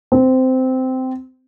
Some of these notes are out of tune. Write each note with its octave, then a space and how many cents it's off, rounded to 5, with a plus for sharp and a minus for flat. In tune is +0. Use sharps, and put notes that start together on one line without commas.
C4 -15